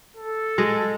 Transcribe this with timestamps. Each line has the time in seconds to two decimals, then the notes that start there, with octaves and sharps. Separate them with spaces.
0.17 A4
0.58 G#3 D#5